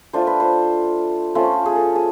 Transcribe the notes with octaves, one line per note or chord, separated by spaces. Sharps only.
A3 D4 F4 C5
B4
C5
A3 C#4 F4 C5
G#4
A4
G#4